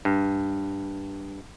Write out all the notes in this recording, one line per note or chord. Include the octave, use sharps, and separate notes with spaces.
G2